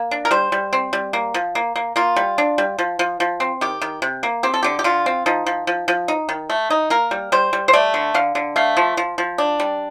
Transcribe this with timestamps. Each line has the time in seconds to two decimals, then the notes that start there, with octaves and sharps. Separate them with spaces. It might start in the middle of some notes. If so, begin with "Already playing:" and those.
Already playing: A#3
0.11 D4
0.25 A#4
0.31 G3 C5
0.52 G3
0.73 C4
0.93 G3
1.13 A#3
1.34 F3
1.55 A#3
1.76 A#3
1.96 A#3 F4
2.16 G3
2.38 D4
2.58 G3
2.78 F3
2.99 F3
3.20 F3
3.40 C4
3.61 D#3 G4
3.81 D#3
4.02 C3
4.23 A#3
4.43 C4 G4
4.54 A4
4.63 D3 G4
4.79 G4
4.84 D3 F4
5.06 C4
5.26 F3 D#4
5.46 F3
5.67 F3
5.88 F3
6.08 D#4
6.29 D#3
6.50 A3
6.70 D#4
6.90 A#3 A#4
7.11 G3
7.32 G3 C5
7.53 G3
7.68 C5
7.73 A3 D5
7.94 D3
8.14 D3 F5
8.35 D3
8.56 A3 F5
8.77 F3
8.97 F3
9.18 F3
9.38 D4
9.60 G3